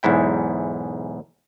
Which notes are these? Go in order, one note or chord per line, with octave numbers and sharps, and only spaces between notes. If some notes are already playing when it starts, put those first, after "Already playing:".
B1 E2 G#2 E4 G5